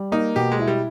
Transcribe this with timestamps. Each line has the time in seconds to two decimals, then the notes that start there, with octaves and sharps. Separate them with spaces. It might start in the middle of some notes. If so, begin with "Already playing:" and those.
Already playing: G3
0.12 A#3 D#4
0.36 B2 G4
0.52 G#3
0.59 E4
0.67 G3